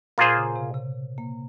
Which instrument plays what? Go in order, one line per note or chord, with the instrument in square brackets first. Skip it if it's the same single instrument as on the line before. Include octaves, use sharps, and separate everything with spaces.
[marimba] A#2 [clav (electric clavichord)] A#3 F4 G#4 C5
[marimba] C#3
C3
C#3
A#3